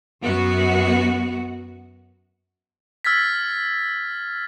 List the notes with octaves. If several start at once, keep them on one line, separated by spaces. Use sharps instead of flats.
F#2 B3 F#4
E6 F6 G#6 A6 B6